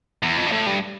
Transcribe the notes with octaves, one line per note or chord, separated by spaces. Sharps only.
E2
F2
G2
A2
G2